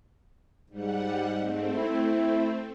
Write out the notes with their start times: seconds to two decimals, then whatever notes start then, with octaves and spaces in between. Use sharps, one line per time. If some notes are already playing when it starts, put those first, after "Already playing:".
0.70 G#2 G3 F#5
1.37 A3 C4
1.75 E4